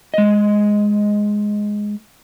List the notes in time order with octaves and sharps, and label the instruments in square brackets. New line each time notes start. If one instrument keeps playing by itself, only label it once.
[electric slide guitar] G#3 D#5